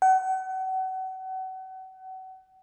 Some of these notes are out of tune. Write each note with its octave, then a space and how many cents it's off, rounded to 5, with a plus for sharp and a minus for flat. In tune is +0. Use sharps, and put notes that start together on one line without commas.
F#5 +35